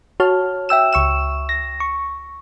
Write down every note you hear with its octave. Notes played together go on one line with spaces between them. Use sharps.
F#4 C#5 A5 F6
E5 G5 E6 E7
C#2 C#6 E6 E7
A#6
C#6